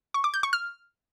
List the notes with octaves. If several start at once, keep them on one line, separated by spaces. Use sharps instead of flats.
C#6
D6
G6
C#6
F6